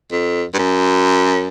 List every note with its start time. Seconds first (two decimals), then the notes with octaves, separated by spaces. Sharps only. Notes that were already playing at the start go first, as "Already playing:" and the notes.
0.12 F2
0.54 G2
0.58 F#2